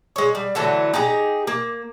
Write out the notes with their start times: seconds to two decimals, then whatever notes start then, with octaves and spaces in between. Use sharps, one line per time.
0.16 G#3 C#5
0.35 G3
0.55 D3 E3 F#3 A3
0.94 D#4 G4 G#4 A#5
1.47 A#3